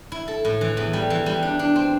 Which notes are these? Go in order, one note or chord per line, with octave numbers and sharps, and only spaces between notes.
E4
A4
A2
E3
E2
G3
E3
G3
D4
D4
C4